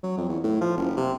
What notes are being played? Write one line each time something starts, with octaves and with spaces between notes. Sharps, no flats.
F#3
F2
E2
A2
F3
F#1
C3